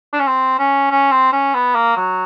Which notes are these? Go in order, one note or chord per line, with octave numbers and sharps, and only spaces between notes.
D4
C#4
C4
C#4
C#4
C4
C#4
B3
A#3
F#3